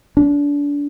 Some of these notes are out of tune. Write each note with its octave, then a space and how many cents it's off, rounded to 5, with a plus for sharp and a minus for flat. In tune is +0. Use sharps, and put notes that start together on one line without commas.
D4 -30